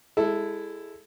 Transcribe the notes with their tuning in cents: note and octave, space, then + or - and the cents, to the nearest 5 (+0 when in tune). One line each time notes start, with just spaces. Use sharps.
G#3 -20 E4 +0 A4 +0